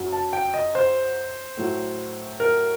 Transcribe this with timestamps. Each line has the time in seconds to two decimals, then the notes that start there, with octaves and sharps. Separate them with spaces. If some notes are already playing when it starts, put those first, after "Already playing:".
Already playing: F#2 F#3
0.13 A5
0.33 G5
0.54 D#5
0.75 C5
1.57 A2 F#3
2.40 A#4